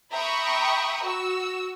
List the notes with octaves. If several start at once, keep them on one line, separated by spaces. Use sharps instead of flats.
E5 G5 A#5 B5 C#6 D#6
F#4 E6